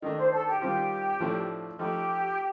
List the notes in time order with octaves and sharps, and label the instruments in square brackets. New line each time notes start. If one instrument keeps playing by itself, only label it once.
[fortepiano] D#3 A3 D4 [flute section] D#5
[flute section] C5
A4
G4
[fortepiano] D#3 G3 C4 F4 [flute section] G4
[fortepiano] A2 F3 A3 D4
[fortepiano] F3 A3 D#4 [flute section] G4